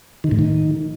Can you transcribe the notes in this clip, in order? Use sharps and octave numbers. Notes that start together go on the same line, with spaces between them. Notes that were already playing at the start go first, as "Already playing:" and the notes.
D#3
A2
D#3